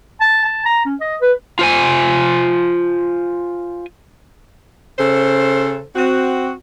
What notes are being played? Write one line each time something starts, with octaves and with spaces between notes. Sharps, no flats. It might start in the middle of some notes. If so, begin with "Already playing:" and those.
A5
A5
A#5
C#4
D#5
B4
F4 C5 G#5
C#3 A4 C5
C4 F#4